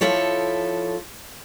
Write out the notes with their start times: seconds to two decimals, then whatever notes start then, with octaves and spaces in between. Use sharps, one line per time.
0.01 F3 E4 A4 C#5